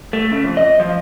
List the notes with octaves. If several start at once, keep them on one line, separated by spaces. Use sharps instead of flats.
A3
C#3
F2
D#5
F3